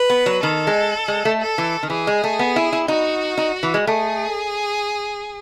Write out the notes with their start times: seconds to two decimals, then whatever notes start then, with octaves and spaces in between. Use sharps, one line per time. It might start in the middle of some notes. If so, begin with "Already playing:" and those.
Already playing: B4
0.10 B3
0.26 F#3
0.43 D#3 A4
0.67 G#3
1.08 G#3
1.25 A3
1.41 A4
1.58 E3
1.83 D#3
1.90 E3 G#4
2.07 G#3
2.24 A3
2.39 B3
2.56 E4
2.72 E4
2.88 D#4 F#4
3.37 D#4
3.63 E3
3.74 G#3
3.87 A3 G#4